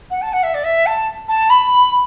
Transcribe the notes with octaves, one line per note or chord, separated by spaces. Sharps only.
F#5
A5
F#5
E5
D5
E5
A5
A5
B5